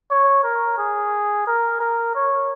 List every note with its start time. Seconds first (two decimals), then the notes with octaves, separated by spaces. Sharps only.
0.10 C#5
0.44 A#4
0.78 G#4
1.47 A#4
1.80 A#4
2.15 C#5